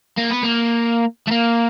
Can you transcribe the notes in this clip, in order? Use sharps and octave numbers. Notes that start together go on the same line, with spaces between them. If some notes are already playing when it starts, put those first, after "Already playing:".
A#3
B3
A#3
A3
A#3